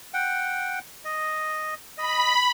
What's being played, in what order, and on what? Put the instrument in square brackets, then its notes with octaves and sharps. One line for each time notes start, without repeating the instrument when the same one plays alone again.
[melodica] F#5 G5
D#5
[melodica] D#5 [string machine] B5